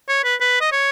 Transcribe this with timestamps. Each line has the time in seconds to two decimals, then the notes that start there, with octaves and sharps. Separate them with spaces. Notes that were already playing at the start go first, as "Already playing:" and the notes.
0.09 C#5
0.24 B4
0.40 B4
0.61 D#5
0.72 C#5